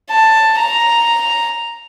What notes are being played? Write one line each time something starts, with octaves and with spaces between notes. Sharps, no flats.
A5
A#5